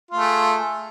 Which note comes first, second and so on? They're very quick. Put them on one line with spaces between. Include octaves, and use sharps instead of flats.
F4 A3 G#4